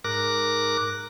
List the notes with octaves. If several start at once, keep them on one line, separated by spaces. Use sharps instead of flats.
G#2 A#4 D6 F#6 A#6